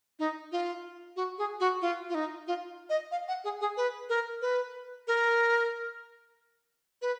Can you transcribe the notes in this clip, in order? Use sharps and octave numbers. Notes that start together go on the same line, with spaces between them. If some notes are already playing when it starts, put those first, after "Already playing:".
D#4
F4
F#4
G#4
F#4
F4
F4
D#4
F4
D#5
F5
F#5
G#4
G#4
B4
A#4
B4
A#4
B4